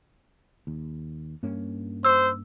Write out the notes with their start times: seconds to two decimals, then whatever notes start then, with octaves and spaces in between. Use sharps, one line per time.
0.67 D#2
1.43 G2 A#3 C#4
2.05 C5 E6